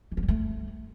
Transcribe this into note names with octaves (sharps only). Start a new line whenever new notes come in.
E3
F3
G3
A3